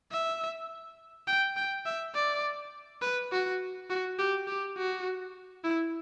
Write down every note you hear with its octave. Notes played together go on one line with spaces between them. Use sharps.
E5
G5
G5
E5
D5
B4
F#4
F#4
G4
G4
F#4
E4